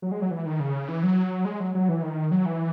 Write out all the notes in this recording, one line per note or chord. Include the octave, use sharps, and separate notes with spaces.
F#3
G#3
F#3
E3
D#3
C#3
E3
F#3
G#3
F#3
F#3
E3
D#3
F#3
E3